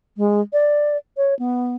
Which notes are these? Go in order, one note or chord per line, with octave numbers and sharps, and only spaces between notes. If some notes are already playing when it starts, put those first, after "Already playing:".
G#3
D5
C#5
B3